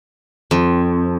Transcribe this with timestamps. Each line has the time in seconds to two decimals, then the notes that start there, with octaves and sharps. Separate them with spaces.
0.51 F2